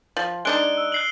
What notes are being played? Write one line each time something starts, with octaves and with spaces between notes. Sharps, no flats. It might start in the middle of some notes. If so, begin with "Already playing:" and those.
F3
G#3 D4 D#4 F#6 D7 G7
E6
F#6 C7 F#7